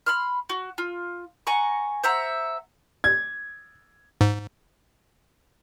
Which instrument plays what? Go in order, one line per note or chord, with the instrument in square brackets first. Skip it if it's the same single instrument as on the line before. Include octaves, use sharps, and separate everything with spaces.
[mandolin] B5 C6 F6
F#4
F4
F#5 G#5 A#5 C#6
C5 E5 F#5 A#5
[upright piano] G#6
[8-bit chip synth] G#2